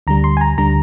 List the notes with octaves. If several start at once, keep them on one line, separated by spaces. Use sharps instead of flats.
D2 D3 G3 A#5
C6
G#5
A#5
D2 D3 G3 A#5